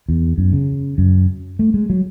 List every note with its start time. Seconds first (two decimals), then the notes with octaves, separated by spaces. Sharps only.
0.09 E2
0.38 F#2
0.53 C#3
0.98 F#2
1.59 A3
1.74 G#3
1.90 F#3